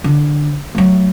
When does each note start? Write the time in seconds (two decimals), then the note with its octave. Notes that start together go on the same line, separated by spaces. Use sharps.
0.04 D3
0.75 F#3 A3